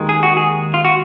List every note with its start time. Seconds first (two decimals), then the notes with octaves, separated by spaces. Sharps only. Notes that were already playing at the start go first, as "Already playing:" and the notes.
Already playing: D#2 D#3 G#3
0.09 G#4
0.23 F#4
0.37 G#4
0.74 F4
0.85 F#4